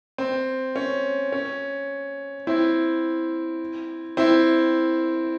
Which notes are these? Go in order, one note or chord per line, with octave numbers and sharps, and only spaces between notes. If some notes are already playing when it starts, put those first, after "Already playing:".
C4
C#4
C#4
C4 E4
C4 E4